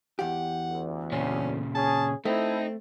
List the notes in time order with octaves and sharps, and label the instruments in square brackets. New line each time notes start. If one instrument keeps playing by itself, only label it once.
[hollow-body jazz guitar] E2 G4 [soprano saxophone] F#5
[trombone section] D2
[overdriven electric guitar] A#2 C#3 [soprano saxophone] C#4
[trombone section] C#4 G#4 [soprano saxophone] A5
[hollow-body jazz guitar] A3 [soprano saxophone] C4 [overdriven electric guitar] D#4 [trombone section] E4 A4